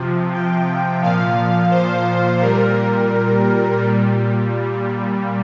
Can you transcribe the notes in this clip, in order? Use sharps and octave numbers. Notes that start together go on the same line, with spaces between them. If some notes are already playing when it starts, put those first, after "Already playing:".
Already playing: C3 F3
G5
A#2 F3 F5
C5
A#2 G3 A#4
A#2 G3